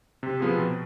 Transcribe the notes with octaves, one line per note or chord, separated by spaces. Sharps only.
C3
F3 B3 F4 G#4
B2